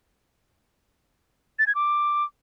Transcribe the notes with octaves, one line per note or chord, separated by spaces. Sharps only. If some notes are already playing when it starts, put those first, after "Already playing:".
A6
G#6
D6